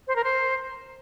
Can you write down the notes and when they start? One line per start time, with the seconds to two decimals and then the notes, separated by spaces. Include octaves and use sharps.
0.08 C5
0.16 A#4
0.24 C5